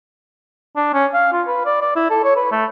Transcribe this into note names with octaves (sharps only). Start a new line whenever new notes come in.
D4
C#4
F5
F4
B4
D5
D5
E4
A4
C#5
B4
A3